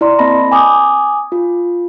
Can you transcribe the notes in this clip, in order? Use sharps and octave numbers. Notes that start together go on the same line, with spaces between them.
E4 D5 C6
A#3 C4 D#5 A5 B5 A#6
G#5 D6 D#6
F4